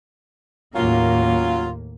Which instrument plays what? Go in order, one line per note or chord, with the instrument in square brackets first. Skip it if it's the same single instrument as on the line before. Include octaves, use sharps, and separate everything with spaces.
[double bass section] D#2 A2 A#3 [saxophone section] F#3 C#4 F4